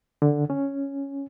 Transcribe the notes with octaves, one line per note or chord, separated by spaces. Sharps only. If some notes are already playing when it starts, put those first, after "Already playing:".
D3
C#4